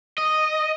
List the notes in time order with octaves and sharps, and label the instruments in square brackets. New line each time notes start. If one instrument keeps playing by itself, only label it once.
[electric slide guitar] D#5